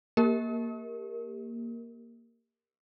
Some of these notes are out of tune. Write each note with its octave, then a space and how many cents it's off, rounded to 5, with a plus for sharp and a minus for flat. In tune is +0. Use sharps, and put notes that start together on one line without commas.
A#3 +0 G4 +25 A#4 +0